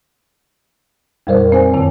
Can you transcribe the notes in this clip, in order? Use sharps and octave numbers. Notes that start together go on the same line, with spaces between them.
F2 A#2 G3 A#4 C5 D5
C4 C5 G#5
F#2 C3 D#3 A5